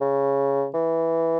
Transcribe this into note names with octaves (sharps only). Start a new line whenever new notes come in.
C#3
E3